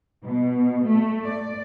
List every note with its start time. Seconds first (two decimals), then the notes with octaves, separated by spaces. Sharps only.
0.25 B2
0.86 A3
1.25 D5